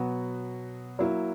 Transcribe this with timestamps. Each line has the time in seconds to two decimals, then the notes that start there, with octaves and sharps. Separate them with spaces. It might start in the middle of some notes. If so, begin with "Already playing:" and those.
Already playing: B2 F#3 B3 F#4
0.99 F#3 A#3 E4